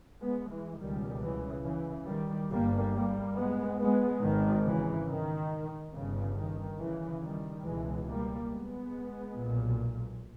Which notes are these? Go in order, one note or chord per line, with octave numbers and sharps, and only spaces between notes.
G#3 B3
E3 G#3
C#2 B2 D#3 G3
C#3 E3
C#3 E3
D#3 G3
G1 G2 G3 A#3
G3 A#3
G#3 B3
G#3 B3
G#1 G#2 D#3
C#3 E3
D#3
G1 G2 C#3
D#3
C#3 E3
D#3 G3
C#2 B2 E3 G#3
G3 A#3
G#3 B3
B1 A#2